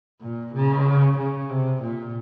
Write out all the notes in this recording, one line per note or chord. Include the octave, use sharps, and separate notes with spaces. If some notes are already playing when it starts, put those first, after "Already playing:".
A#2
C#3
C#3
C3
A#2